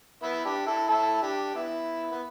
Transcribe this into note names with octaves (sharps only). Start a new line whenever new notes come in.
B3 E4
D4 G4
E4 A4
E4 A4
D4 G4
B3 E4
B3